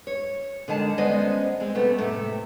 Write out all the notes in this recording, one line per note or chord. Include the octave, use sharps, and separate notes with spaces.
C#5
D3 D#3 G#3 A5
G#3 B3 C#4 C5 D5 D#5
G#3 C4
C3 A3 B3
A2 C3 A3